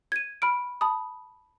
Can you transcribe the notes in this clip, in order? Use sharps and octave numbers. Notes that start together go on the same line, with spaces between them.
G#6 D#7
B5 F6 D7
A5 B5 D#6